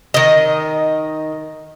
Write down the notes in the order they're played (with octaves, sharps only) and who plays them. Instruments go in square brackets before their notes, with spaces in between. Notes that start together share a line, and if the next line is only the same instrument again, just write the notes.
[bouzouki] D#3 D#5